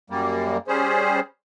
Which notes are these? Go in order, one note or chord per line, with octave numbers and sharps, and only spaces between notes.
F#2 G3 A#3
G3 C#4 G#4 C5